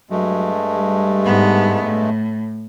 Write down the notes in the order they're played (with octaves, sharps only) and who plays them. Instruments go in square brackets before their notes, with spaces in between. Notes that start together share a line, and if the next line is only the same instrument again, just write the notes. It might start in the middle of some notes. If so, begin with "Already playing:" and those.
[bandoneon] G2 G#3 A3 [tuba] F#3
[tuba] G3
[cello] G#2 B3
A2